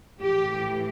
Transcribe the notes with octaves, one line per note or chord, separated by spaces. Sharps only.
A2 E3 G4